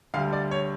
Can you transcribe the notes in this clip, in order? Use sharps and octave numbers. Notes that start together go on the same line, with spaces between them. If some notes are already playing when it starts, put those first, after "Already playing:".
D2 D3 G3 F5
D5
C#5